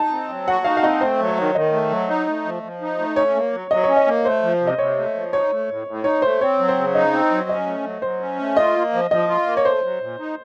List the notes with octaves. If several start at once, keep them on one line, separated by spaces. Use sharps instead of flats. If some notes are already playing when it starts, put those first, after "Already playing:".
Already playing: D#4 A5
C4
F#3
F#4 F#5
D#4 F5
F5
C4 D#5
A3 C5
F#3
C#5
D#3
D#3 D#5
A3
F#3
D#4
A3
F3
F3
D#4
A3
C#4 C#5
A#3
F#3
F#3 D#5
C#4 C#5
D#5
A#3
A3 C5
F3
C3
D#5
C3 C#5
A3
F3
D#4 C#5
A3
A2
A2
D#4 C#5
A3 C5
C4 C#5
F#3
C5
C#3
D#4 D#5
C4
F#3
C#4 D#5
A3
F#3
F#3 C5
C#4
A3
F4 D#5
A#3
F3
F3 D#5
F4
A#3
C#5
A3 C5
F#3
A#2
D#4